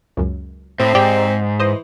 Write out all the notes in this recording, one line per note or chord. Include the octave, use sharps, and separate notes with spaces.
C#2 F#2
A2 C4
G#2 G4 D5 G5
E3 C5 D#5